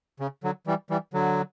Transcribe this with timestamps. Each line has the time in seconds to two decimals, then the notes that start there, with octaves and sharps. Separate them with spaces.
0.20 C#3
0.44 D3 F#3
0.67 E3 G3
0.90 E3 G3
1.14 D3 F#3